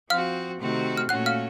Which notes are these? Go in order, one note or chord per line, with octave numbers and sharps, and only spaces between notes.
F3 C4 F#4 F5 F6
C3 D#3 A3 C4 F#4
F6
A#2 A3 C#4 F#4 F#5 F#6
F5 F6